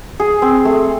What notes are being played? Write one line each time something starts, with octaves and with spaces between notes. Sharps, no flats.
G#4
C4
A3